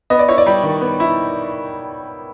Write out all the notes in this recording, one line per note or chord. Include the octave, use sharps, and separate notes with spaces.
B3 D#5
D5
E4 C#5
D5
G3
D#3
B3
E4